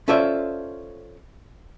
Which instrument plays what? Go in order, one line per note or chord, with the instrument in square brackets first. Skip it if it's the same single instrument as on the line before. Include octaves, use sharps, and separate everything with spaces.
[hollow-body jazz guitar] C#4 F4 A4 C5 D5 E5